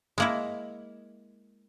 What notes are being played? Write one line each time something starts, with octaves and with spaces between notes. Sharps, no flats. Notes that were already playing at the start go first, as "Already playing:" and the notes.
G#3 A#3 E4